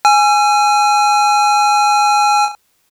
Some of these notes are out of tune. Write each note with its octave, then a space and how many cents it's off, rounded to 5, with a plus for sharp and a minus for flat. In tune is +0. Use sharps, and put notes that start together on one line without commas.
G#5 +0 E6 +45